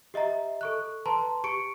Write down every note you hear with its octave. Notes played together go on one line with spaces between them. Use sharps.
G4 D#5 E5 A#5
A4 C#6 F#6
B4 A5 A#5 C6
G4 C#6 C#7 D7